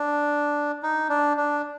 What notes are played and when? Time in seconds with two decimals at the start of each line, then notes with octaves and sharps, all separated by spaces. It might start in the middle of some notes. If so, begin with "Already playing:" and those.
Already playing: D4
0.83 D#4
1.09 D4
1.37 D4